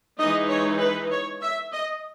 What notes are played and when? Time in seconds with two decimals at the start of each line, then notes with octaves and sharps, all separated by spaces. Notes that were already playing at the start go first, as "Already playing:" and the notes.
0.18 E3 G#3 D#4 D#5
0.49 C#5
0.80 B4
1.11 C#5
1.42 E5
1.72 D#5